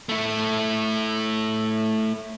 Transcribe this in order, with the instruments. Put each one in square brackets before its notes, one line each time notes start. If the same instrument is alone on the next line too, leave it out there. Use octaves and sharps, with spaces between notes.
[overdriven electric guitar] A3 E4